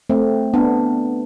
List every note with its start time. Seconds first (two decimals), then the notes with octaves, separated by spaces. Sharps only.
0.10 A3 C4
0.54 B3 D4